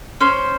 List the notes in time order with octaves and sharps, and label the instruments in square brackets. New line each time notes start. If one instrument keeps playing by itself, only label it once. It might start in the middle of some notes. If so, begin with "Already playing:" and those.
[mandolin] C#4 C5